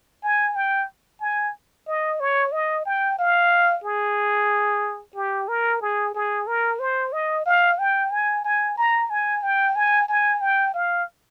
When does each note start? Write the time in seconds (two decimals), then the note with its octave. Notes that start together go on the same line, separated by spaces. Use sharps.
0.23 G#5
0.56 G5
1.21 G#5
1.87 D#5
2.20 C#5
2.52 D#5
2.85 G5
3.19 F5
3.84 G#4
5.15 G4
5.48 A#4
5.82 G#4
6.15 G#4
6.47 A#4
6.79 C5
7.12 D#5
7.46 F5
7.79 G5
8.11 G#5
8.44 G#5
8.78 A#5
9.10 G#5
9.43 G5
9.76 G#5
10.08 G#5
10.41 G5
10.74 F5